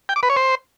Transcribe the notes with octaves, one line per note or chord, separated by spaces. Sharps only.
G5
D6
B4
C#5
C5